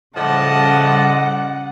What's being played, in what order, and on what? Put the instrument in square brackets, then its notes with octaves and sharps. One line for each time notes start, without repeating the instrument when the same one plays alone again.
[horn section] A2 F3 A5 [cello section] C#3 G3 [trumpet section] D5 D#5 [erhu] F#5